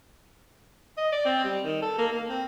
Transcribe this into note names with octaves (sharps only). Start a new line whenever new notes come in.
D#5
D5
C4
G3
D#3
A4
A#3
A#3
C4